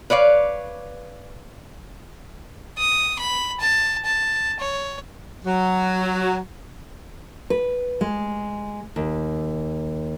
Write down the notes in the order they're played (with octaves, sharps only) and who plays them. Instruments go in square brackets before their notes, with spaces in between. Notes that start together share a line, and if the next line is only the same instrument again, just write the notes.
[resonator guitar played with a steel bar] B4 C#5 D5 F5
[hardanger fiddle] D#6
B5
A5
A5
C#5
[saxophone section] F#3
[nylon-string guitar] B4
G#3
D#2